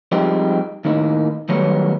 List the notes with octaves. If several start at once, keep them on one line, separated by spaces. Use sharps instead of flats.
F3 G3 G#3 C4 D#4 G4
D#2 A2 D#3 D#4
D#3 F#3 G3 A3 B3 C#5